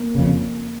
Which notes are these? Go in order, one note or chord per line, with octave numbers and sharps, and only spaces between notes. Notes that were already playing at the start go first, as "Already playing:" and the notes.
Already playing: A#3
F2 C#3